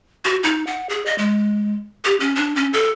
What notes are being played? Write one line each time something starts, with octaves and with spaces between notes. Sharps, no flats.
F#4
D#4
F#5
G#4
D#5
G#3
G4
C#4
D4
C#4
A4